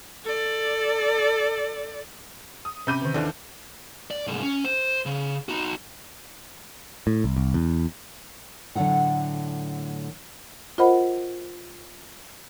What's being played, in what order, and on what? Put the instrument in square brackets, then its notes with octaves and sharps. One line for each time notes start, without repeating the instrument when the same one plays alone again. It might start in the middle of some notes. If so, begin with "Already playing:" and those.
[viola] A4 D5
[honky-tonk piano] D#6
[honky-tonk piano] C3 G6 D#7 [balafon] C#4 B5 D6
[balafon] D3 D#3
[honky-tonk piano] D#2 D3 E3 [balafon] D5
[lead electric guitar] D5
C2 G#2
C#4
C5
C#3
D#4 F#4
[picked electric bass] A2
C2
C2
E2
[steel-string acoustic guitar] A2 D3 F#3 A#3 A4 F#5
[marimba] F4 A#4 C5 D#5 F#5 B5